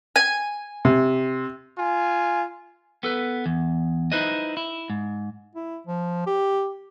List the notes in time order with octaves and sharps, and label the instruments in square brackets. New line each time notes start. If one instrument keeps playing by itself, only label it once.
[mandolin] G#5
[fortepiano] C3
[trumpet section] F4 G#5
[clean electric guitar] B3 A4 B4
E2
D#4 E4 B4 C5 D#5
E4
G#2
[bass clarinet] E4
F3
G4